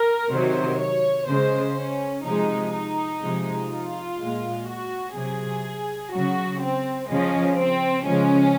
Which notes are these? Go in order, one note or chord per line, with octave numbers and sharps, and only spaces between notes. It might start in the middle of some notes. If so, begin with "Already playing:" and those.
Already playing: A#4
C3 D#3 F#3 C5
C#5
C#3 G#3 C5
C#4
C3 F3 G#3 D#4
D#4
C3 F3 G#3
F4
A#2 G#3
F#4
C3 F#3 G#4
C#3 F#3 F#4
C4
C#3 F3 G#3 C#4
C4
C#3 F3 G#3 C#4